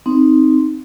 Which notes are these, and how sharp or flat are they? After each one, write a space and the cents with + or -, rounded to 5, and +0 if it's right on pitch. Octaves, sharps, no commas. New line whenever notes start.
C4 +0 D#4 +0